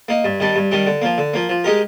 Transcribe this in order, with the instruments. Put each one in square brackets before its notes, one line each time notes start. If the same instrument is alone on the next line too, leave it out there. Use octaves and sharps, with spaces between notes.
[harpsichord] A#3 D#4
G2
D#3 G3 D4
G2
D#3 G3 D4
D3
F3 A#3
D3
F3 A#3
F3
G#3 D#4 G4 A#4